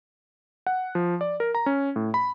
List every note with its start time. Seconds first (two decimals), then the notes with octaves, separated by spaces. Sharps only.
0.67 F#5
0.95 F3
1.21 D5
1.40 A#4
1.55 A#5
1.66 C#4
1.96 A2
2.14 B5